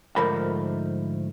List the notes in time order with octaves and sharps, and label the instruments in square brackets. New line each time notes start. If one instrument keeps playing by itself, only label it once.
[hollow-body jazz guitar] G#2 D3 F3 A3 A#4 B5